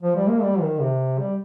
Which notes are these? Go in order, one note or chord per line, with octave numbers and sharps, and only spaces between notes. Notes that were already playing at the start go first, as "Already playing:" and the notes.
F3
G3
A#3
G3
D#3
C3
G3